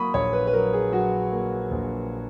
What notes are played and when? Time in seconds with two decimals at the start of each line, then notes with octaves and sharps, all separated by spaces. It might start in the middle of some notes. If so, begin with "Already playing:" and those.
Already playing: F#3 A#3 B5 C#6 D#6
0.14 A#1 C#5
0.33 B4
0.47 B4
0.53 F#3 A#4
0.73 G#4
0.92 F#3 F#4
1.31 A#3
1.71 A#1